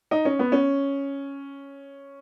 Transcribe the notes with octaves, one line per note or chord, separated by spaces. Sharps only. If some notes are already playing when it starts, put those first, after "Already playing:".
D#4
C#4
B3
C#4